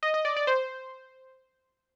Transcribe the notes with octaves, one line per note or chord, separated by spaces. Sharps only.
D#5
D#5
D5
D5
C5